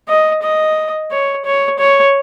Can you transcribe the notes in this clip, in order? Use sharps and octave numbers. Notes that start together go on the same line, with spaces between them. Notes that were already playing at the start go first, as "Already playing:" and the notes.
D#5
D#5
C#5
C#5
C#5